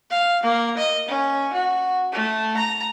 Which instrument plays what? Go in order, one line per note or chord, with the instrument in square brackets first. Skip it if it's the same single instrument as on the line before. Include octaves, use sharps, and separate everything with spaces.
[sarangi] F5
A#3
D#5
C#4
F#4
A3
A#5